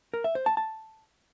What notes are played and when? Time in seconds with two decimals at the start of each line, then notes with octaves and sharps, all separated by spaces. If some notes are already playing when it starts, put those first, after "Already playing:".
0.14 A#4
0.24 E5
0.35 C5
0.46 A5
0.57 A5